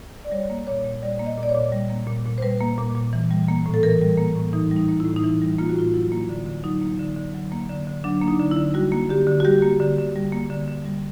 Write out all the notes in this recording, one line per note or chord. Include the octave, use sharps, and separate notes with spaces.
D5
G3 C#5
A#3
A#2 C#5
A#2
G3 D5
A#3
D#5
A#2
D5
C#5
A#2
G3
A#3
A#2
A#2
C5
G3 B4
A#3
A#2
A#2
E3
G3
A#3
A2
A4
E3 A#4
G3
A#3
A2
E3 D#4
G3 D#4
A#3
E4
A2
D#4
E3 E4
G3
A#3 F4
F#4
A2 F4
F#3 E4
A#3
D3
D3
F#3 D#4
A#3
D3
D3
F#3
A#3
D3
D3
F#3 D4
A#3 D4
D#4
D3
E4
D3
G3 F#4
A#3
D3 G4
D3
F#4
G3 G4
A#3
D3
D3
G3
A#3
D3
D3
G3